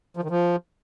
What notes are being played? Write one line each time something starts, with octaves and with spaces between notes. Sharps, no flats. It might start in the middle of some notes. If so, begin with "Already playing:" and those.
F3
D#3
F3